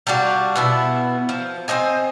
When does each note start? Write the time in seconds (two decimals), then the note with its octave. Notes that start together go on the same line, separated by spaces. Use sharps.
0.07 G3 D4 F4 F#4
0.56 B2 B3 E4
1.29 F3
1.68 C4 C5 D#5 G#5